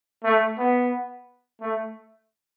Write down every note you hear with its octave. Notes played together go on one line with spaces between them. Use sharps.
A3
B3
A3